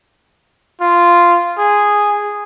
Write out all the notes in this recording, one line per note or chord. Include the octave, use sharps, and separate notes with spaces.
F4
G#4